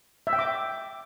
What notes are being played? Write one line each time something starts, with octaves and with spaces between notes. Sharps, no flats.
E5
G5
D6